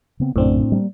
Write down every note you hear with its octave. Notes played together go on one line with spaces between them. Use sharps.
C#3 B3 C4
A#1 F#2 A2 C#3 C4 D4
G3 A#3